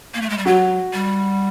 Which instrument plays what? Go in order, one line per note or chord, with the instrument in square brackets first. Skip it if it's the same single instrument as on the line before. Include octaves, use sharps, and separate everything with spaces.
[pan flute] A#3
A3
G#3
G3
[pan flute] F#3 [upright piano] F#4
[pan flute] G3